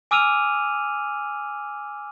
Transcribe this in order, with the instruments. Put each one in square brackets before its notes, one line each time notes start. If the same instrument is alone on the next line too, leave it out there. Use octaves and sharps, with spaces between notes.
[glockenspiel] G#5 D6 E6 F6 D#7 F7